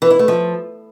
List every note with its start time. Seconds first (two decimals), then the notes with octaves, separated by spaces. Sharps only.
0.02 E3
0.11 E4
0.19 A3
0.28 F3